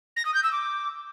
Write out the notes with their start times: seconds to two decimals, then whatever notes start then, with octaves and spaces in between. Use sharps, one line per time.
0.16 A#6
0.25 D#6
0.34 G6
0.43 E6
0.52 D6